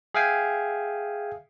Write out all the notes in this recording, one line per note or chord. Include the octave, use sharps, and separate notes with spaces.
G#4 E5 F5 G5 G#5